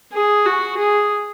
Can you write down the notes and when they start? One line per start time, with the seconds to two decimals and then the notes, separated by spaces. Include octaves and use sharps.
0.13 G#4
0.45 F#4
0.78 G#4